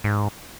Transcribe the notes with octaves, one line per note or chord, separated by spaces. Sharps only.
G#2